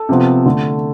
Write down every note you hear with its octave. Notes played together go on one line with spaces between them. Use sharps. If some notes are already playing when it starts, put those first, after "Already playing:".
Already playing: A4
C3 F3 B3
D3 A3